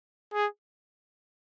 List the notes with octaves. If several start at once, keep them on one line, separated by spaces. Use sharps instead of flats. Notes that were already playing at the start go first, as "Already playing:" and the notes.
G#4